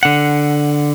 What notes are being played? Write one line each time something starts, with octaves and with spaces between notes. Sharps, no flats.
D3 F#5